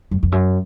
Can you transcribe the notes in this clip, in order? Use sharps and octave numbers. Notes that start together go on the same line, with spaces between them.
F#2
F2
F#2